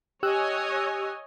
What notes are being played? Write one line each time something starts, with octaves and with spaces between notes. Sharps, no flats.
G4 C#5 D#5 G#5 E6 F#6